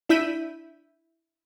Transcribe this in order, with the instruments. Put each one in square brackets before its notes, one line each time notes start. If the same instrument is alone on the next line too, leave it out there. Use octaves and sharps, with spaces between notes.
[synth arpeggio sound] D4 E4 E6 G6 B6 D#7